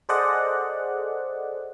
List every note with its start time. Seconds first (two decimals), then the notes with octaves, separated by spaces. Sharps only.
0.09 G#4 A4 C5 D5 D#5 F#5